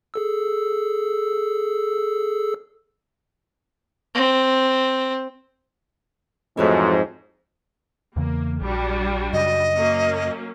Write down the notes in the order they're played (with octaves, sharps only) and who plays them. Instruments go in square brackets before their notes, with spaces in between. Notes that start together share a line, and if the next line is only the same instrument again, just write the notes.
[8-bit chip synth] G#4 A4 E6
[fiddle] C4
[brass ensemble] F2 G#2 [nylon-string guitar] E3 F#3 A3
[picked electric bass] E2 C#3 E3 [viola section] A#3
[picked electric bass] A#1 [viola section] G3 D4 F#4
[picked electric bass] F#2 C#3 [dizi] D#5
[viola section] F#3 A#3 C#4